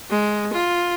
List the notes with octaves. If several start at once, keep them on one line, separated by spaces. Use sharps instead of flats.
G#3
F4